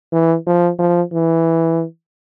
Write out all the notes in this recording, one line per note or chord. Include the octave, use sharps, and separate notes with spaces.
E3
F3
F3
E3